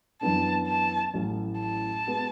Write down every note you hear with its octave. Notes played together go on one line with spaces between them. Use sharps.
F#2 E3 B3 D4 A5
A5
A1 A2 F#3 C#4 E4
A5
G#3 B3 F#4